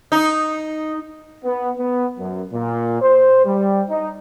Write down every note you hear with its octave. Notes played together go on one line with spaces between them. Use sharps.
D#4
B3
B3
F#2
A#2
C5
G3
D#4